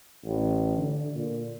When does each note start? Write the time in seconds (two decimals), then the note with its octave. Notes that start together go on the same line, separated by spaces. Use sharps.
0.25 A1
0.77 D3
1.15 A#2